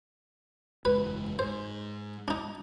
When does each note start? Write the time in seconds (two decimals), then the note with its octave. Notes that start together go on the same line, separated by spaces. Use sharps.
0.85 F#1 E2 G#3 B4
1.39 G#2 C5
2.28 D4 D#4